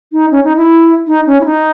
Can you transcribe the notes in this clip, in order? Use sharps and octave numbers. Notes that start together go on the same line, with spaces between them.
D#4
C#4
D#4
E4
D#4
C#4
E4
D#4